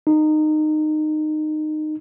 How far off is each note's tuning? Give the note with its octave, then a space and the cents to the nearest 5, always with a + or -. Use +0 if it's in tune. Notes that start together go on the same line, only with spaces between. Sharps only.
D#4 -20